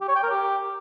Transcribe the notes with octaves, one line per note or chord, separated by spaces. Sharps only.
G4
C#5
G5
A#4
G4